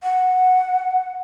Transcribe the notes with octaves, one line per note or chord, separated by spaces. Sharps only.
F#5